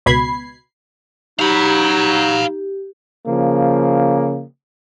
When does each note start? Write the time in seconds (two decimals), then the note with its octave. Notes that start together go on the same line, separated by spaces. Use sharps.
0.06 C#2 B2 B5 G#6 C7
1.39 F#3 D#4 G4 F5 B5
3.27 C#3 F3 A#3